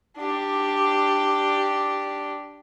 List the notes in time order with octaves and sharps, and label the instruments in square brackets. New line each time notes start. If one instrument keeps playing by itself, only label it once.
[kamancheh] D4 G4